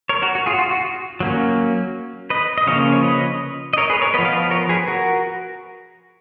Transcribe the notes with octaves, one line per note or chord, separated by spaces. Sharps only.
A#4 C#5
F#4 A#4
F#4
F4 G#4
F#4
F4
F#4
F#3 A#3 C#4
B4 D#5
D#5
C#3 F3 A#3 C#4 C#5 F5
C#5
B4 D#5
D#5
A#4 C#5
G#4 B4
A#4 C#5
F3 B3 B4 D#5
F5
B4 D#5
A#4 C#5
G#4 B4
F#4 A#4